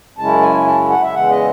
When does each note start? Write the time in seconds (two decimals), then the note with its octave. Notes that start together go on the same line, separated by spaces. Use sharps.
0.18 F#2 C#3 G#3 C#4 E4 A5
0.42 G#5
0.66 A5
0.89 F#5
1.02 E5
1.14 E2 C#3 E3 G#3 F#5
1.30 D#5